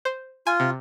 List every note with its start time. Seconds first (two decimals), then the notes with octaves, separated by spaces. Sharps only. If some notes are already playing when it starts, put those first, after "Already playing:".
0.05 C5
0.47 F4 G#5
0.60 C3